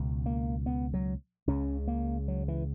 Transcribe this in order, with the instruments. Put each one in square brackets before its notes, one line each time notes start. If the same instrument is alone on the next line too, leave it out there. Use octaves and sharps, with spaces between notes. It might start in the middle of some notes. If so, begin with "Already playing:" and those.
Already playing: [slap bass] C#2 B2
A#3
B3
F#3
C#2 C#3 C#4
A#3
F#3
E3